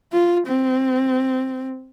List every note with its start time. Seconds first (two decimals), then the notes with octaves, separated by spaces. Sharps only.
0.13 F4
0.47 C4